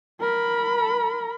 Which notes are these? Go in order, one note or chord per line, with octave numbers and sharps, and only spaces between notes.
A#4 B5